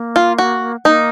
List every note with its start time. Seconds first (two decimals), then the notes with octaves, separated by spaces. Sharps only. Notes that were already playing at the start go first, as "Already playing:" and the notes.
Already playing: A#3
0.16 F4
0.38 F#4
0.85 A#3 D#4